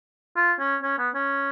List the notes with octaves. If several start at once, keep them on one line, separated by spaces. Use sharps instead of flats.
F4
C#4
C#4
B3
C#4